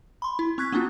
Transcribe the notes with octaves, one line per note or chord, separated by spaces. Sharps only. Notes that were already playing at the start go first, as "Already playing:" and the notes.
B5 C6
E4
C4 C#6 F#6 G#6 B6
A#3 B3 C#4 D4 F4 F#4